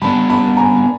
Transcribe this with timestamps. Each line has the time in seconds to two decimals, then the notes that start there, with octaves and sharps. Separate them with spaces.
0.02 G3 B3 D4 A5 B5
0.30 A5 B5
0.57 G#5 A#5
0.76 G#5